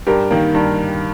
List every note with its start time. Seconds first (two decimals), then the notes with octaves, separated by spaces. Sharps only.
0.07 G2 G4 A#4
0.31 D#3 A#3
0.55 G2